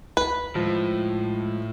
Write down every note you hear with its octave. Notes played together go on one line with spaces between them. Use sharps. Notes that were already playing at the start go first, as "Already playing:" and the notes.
D2 B4
A2 F3 G#3